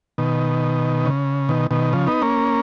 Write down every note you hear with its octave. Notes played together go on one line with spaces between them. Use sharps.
B2 D#3
C#3
B2 D#3
B2 D#3
C#3 F3
B3 D#4
A#3 C#4